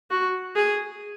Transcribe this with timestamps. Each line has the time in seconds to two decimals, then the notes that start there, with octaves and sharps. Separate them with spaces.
0.11 F#4
0.56 G#4